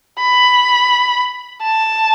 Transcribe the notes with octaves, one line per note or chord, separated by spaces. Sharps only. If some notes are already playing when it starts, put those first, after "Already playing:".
B5
A5